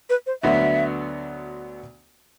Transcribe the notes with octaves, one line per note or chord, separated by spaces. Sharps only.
B4
C5
D2 D3 F#3 B3 F#4 E5